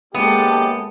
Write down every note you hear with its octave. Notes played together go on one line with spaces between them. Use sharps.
F#2 D#3 G#3 A#3 B3 G4 A4